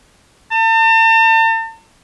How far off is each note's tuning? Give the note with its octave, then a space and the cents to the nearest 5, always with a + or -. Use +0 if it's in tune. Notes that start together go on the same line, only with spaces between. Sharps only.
A5 +40